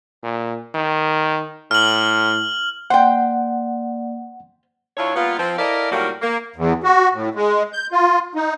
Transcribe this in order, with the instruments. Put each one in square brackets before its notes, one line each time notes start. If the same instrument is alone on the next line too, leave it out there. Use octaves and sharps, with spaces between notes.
[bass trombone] A#2
D#3
[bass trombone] A2 [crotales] F6 F#7
[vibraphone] A#3 D5 [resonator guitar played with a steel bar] C5 G5 [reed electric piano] F#5
[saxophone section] D2 D4 E4 F4 C#5
G3 A#3 B3 F4
F3 C4
E4 A4 A#4 D5 D#5 F5
A2 D#3 F#3 G3 A#3
A#3
[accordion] E2
F#4
A2
G#3
G6
F4
D#4